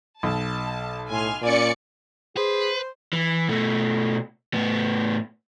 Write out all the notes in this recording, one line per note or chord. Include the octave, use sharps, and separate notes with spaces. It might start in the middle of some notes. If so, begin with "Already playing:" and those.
B1 A5
A2 G#5 C6 F6
A#2 C#4 D5 G#5 C#7
G#4 B4 C5
E3
B2 A3
A2 B3